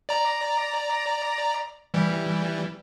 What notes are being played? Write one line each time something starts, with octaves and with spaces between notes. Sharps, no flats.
D5 A#5
E3 G3